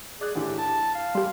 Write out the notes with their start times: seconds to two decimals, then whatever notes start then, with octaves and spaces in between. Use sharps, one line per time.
0.21 G#4 D5 F#6
0.35 A2 D3 E3 G4
0.58 A5
0.95 F5
1.15 G3 G4 C6